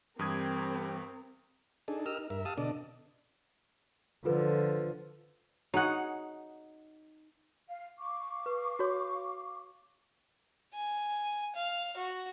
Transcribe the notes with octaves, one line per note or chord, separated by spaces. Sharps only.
G2 E3 G3 C4 G4 A#4 D#6 G#6
D4 D#4 G#4 A4
G4 A#4 D#5 E6 F6
D#4
G2 A#4 E5
G4 F5 A5 D#6 E6
B2 D3 D4 A4 D5 D#5
D3 F3 F4 A4 B4
D#4 F#4 G#4 C#5 F#5
F5
F5 C#6 D6
B4
F#4 C#5
G#5
F5
F#4